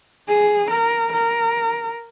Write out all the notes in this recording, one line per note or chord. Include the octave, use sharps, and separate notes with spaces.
G#4
A#4
A#4